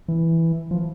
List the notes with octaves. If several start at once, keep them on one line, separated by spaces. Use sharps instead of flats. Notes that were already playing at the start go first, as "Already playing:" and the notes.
E3
F3